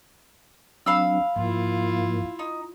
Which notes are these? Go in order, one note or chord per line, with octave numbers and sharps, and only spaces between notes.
F#3 C4 D4 F5 B5 E6
G#2 F3 A#3 E4 F4
D#4